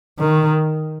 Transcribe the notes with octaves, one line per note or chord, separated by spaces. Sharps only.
D#3